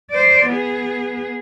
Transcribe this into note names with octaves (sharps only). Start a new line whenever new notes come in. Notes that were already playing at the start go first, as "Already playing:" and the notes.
C5 D5
B3 G#4